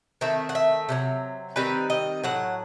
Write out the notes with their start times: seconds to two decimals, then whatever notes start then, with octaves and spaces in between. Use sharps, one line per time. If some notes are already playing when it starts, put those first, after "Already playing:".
0.21 D#3 A3 C4 E5
0.49 F#5
0.55 E5
0.89 C3 D#3 F#3
1.56 D#3 G3 C4 D#4 B4
1.90 D#5
2.23 A2 F#3 F#5